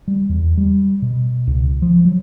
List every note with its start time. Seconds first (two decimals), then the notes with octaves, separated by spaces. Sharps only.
0.08 G3
0.29 E2
0.57 G3
1.02 B2
1.47 C#2
1.82 F3
2.05 F#3